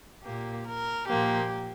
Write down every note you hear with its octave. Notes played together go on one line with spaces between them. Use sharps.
A#2 A#3 G4
A#4
A#2 F3 A#3 G4